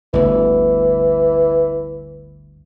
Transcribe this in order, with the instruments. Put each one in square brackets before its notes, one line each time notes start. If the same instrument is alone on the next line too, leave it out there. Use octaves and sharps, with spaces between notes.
[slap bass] G1 D2 [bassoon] E3